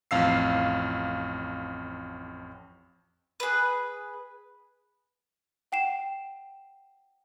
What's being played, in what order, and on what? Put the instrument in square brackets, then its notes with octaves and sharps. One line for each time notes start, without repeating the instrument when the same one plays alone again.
[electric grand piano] A1 F2 F5 E6 C7
[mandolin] G#4 B4
[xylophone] F#5 G5 C7 E7